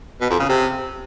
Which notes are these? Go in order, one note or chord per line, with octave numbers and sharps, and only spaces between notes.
B2
F2
C#3
C3